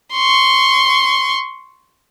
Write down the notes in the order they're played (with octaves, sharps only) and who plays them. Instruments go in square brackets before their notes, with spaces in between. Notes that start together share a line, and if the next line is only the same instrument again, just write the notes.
[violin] C6 C#6